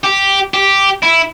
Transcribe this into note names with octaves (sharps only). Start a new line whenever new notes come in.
G4
G4
E4